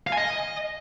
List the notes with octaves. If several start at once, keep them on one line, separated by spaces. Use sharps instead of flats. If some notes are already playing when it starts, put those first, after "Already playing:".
F5
G#5
D#5